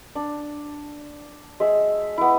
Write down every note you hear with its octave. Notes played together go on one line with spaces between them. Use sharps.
D4
G#3 E5
B3 E4